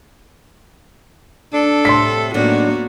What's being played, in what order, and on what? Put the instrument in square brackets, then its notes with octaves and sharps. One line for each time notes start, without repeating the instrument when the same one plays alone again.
[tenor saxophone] D4 [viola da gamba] A4
[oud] A2 C3 A3 [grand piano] C6 B6
[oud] A2 D#3 F#3 [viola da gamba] A#3 B3 F#4 [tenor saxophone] D4